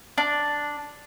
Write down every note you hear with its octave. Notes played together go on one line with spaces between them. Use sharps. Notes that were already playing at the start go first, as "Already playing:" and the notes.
D4